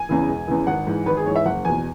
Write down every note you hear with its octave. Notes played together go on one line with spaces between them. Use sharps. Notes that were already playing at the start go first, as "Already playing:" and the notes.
Already playing: G#5
E2 C#3 E3
E1
E2 C#3 E3
G#1 F#5
G#2 E3
G#1 B4
G#4
G#2 E3 C#5
E5
F#1 F#5
E2 B2 G#5